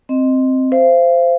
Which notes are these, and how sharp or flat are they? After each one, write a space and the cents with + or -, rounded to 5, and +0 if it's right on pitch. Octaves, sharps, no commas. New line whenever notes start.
C4 +0 D#5 -5
C5 -10 F5 -35